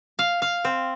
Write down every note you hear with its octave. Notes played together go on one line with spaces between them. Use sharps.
F5
F5
C4